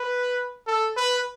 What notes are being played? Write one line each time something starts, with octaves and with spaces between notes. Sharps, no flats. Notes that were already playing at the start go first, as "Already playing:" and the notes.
Already playing: B4
A4
B4